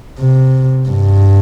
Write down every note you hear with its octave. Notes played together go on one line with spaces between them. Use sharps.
C3
G2